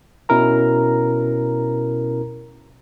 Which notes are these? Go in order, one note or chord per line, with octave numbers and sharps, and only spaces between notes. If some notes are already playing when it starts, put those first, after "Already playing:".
B2 C#4 E4 A#4 A#5